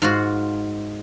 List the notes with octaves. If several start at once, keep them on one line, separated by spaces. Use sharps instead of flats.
G#2 F4 F#4